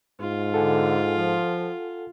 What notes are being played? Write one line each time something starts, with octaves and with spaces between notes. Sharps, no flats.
G#2 F4
D3 A4 F#5 G#5
F3